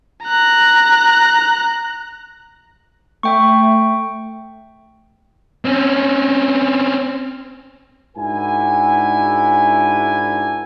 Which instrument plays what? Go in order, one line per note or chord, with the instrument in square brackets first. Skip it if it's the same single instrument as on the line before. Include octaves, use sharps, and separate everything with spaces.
[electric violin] A#5 F#6
[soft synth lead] A3 [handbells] E5 G5 C#6
[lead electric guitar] C4 C#4
[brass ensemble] G#2 D4 E4 F#4 A#4 G#5